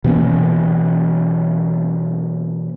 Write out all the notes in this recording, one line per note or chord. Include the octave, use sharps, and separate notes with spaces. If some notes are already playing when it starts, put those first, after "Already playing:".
B2 E3 A#3 C#4